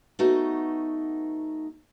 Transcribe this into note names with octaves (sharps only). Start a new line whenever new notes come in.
A3 B3 D#4 F#4